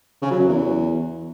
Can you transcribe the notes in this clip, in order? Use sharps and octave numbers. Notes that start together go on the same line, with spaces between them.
C#3
F#3
F#2
E2